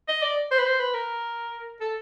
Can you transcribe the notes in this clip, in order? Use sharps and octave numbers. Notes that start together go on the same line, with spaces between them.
D#5
D5
C5
B4
C5
B4
A#4
A4